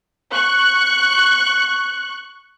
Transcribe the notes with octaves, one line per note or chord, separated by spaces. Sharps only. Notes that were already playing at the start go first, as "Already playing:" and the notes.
C#6 F#6